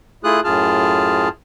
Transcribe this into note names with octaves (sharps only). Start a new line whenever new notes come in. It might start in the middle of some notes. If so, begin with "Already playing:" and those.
A3 E4 F4 G#4 D#6 F#6
F#2 A2 F4 G#4 A5 F6